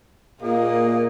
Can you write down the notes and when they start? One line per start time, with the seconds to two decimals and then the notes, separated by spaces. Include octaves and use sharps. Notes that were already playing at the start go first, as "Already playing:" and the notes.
0.42 A#2 A#3 G#4 D#5